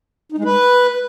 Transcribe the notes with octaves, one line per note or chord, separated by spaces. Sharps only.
D#4
G#3
B4